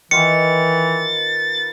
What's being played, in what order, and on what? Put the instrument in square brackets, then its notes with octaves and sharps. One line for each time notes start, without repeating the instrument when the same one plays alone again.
[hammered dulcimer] D#3 F4 B4 [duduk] E3 [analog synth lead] A6 [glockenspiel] C#7